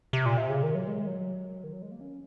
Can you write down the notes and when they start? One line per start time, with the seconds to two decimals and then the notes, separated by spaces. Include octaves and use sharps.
0.13 C3
0.26 A#2
0.37 C3
0.50 C#3
0.63 D#3
0.75 F#3
0.88 G#3
1.07 F#3
1.64 D#3
1.73 F#3
1.82 G#3
1.92 A#3
2.01 C#4